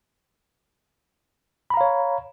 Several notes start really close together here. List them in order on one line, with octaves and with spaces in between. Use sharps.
B5 A#5 F5 C#5